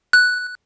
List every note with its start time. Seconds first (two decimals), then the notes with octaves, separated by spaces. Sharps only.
0.13 F#6